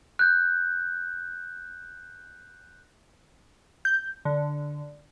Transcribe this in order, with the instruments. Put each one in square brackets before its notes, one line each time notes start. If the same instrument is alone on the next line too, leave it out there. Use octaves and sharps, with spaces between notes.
[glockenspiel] F#6 G6
[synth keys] G6
D3